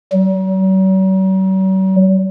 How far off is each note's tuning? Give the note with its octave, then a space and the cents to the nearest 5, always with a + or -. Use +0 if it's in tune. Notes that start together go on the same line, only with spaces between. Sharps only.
F#3 +45